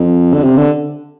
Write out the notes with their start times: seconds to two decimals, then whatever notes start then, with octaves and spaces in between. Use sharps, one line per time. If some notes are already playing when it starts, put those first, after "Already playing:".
Already playing: F2
0.33 D3
0.43 C3
0.57 D3